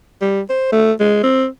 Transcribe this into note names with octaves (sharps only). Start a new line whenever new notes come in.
G3
C5
A3
G#3
C4